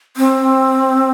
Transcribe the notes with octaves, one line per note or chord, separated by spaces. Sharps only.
C4